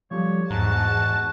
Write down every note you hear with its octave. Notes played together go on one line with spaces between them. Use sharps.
F3 G3 A3 C#5
E2 G#2 F#4 A5 A#5